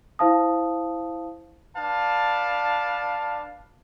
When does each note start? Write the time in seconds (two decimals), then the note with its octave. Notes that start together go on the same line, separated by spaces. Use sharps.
0.19 E4 C5 F5 A5 D#6
1.76 D4 B4 F5 A5